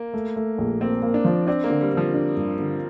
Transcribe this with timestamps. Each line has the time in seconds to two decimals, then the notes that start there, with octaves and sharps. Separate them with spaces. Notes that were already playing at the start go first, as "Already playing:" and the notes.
Already playing: A#3
0.14 A3
0.36 A3
0.58 A#1
0.81 A#3 C4
1.02 A#3
1.14 D4
1.25 F3
1.47 C4 D4
1.64 A#3
1.70 D3
1.81 G3
1.91 D3
1.97 F3
2.14 D4
2.37 G2
2.60 D3